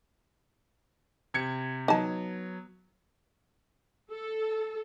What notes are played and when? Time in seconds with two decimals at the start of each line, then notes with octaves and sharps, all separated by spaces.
1.34 C3 G#6 C#7
1.88 F#3 B3 D#4 A5
4.10 A4